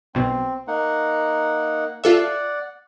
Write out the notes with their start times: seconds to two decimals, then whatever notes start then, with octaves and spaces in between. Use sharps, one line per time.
0.15 B1 B2 C4
0.68 A#3 D#4 F#5
2.04 F4 A4 D5 E5 F#5